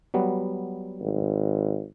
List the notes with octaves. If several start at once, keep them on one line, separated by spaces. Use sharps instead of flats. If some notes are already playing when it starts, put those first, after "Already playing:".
F#3 G3 B3
G#1